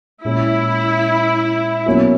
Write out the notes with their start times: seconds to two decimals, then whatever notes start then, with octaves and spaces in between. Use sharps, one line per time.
0.25 A#2 G#3 C#4 E4
1.86 B2 F#3 A#3 C#4 F#4